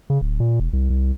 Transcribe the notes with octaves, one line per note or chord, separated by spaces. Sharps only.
C#3
D1
A#2
E1
C2
C2